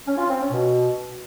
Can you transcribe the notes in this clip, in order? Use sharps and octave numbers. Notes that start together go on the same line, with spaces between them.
C#4
F4
C4
C#4
B2